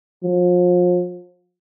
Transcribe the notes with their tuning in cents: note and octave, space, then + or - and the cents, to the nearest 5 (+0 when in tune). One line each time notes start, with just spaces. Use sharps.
F3 +35